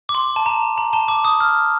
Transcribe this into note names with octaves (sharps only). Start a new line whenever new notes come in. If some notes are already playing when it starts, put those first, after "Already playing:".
D6
C6
A5
A#5
A#5
A5
D6
D#6
F6